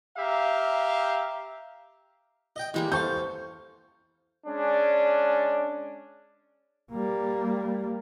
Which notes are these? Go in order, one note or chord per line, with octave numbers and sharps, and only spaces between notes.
G4 E5 F5 A#5
D#5 G5
E3 G3 G#3 A#3
A4 C5 F5 C#6 G6
G#3 C#4 D4
G3 A#3